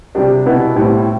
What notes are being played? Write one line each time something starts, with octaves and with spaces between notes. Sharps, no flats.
C3 G3 D4 G4
B2 B3 E4 B4
A2 G3 C4